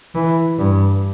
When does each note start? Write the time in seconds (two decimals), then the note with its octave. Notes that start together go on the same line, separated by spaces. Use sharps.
0.15 E3
0.58 G2